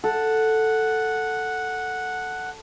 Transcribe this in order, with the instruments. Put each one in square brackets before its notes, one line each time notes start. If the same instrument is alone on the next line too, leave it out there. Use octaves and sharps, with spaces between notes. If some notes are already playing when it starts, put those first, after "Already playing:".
[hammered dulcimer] A4 [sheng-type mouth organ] F#5